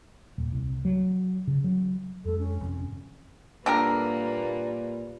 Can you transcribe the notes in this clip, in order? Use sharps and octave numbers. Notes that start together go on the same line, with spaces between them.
D#1
C2
F#3
C#3
F#3
F2 G#3 A4
C#4
G#1 F2 C3
A#2 D3 G3 A#3 G4 A#4 B4